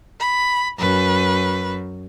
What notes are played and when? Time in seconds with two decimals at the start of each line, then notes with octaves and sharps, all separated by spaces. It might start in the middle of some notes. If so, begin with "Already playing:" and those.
0.20 B5
0.79 F#2 B4